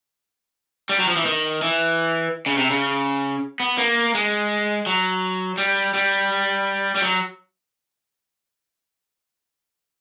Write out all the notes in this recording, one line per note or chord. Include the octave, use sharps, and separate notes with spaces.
G3
F#3
F3
E3
D#3
E3
C#3
C3
C#3
B3
A#3
G#3
F#3
G3
G3
G3
F#3